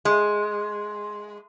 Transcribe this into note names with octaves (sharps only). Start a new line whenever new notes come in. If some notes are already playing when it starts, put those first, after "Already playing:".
G#3 C6